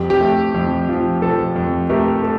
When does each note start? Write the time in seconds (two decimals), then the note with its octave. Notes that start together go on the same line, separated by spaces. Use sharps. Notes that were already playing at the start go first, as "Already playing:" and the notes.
Already playing: F2 G4
0.10 G4
0.21 A3
0.55 F2
0.89 F3
1.22 F3 A4
1.56 F2
1.90 A3 G4 A#4
2.23 A4